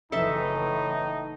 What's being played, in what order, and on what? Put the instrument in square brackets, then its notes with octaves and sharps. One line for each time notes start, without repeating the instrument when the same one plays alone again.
[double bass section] F#1 E3 [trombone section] A2 [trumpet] D#4 [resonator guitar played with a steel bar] A4 E5